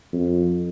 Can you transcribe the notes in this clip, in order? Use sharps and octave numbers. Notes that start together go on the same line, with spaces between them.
F2